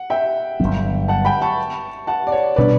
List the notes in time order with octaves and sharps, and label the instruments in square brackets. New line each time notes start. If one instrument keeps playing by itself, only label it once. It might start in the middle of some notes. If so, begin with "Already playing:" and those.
Already playing: [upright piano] F#5
E5 G5
[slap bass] G1 G2 F#3 B3
[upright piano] F#5 A5
G5 B5
A5 C#6
F#5 A5
D5
C#5
[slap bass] B2 G3 D4 [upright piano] B4 D5